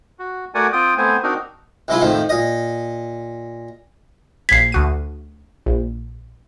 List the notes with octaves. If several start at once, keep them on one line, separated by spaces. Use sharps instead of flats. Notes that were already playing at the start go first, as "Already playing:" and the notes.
F#4
A3 F#4 A#4 D5 F#5 G#5
C4 F4 G5 D#6
A3 B3 C4 C5 G#5
C4 D4 D#4 F#4 A#4
C2 G#3 E4 F4
F2 A2 D#3 F3
A#2 D#5
A#1 G#6 B6 C7
D2 F#4 D#7
A#1